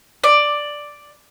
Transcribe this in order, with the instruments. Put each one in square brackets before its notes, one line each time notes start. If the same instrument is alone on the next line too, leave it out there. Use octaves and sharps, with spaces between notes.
[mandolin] D5